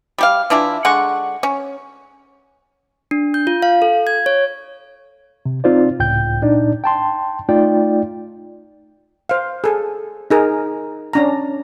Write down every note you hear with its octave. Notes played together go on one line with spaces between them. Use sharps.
G3 G4 F5
E3 D4 E4 F4
D3 G#3 F#5 C#6
C#4
D4
G6
F4
F5
A4
G#6
C#5
C3
C4 D#4 F4 C5 D5
C#2 A2 G5 G6
A#2 D4 D#4 D5
G5 A5 C6
A3 D#4 F4 D5 G5
C5 F5
G#4 A4
D#4 G#4 A#4
C#4 D4 A#5